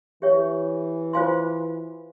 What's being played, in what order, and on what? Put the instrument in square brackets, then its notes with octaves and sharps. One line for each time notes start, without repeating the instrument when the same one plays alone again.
[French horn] E3 [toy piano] G4 C#5 E5 G5 C#6
[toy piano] F4 C5 F5 G#5 C6